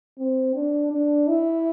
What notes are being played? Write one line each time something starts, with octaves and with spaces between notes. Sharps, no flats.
C4
D4
D4
E4